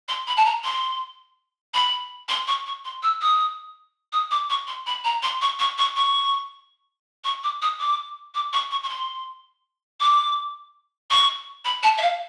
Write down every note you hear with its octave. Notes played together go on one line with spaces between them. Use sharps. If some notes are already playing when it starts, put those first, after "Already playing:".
C6
B5
A5
A#5
C6
B5
C6
C#6
C#6
C6
E6
D#6
D#6
D6
C#6
C6
B5
A#5
C6
C#6
C#6
C#6
C#6
C#6
D6
D#6
D6
D6
C#6
C#6
C#6
C6
D6
C#6
B5
A5
E5
F5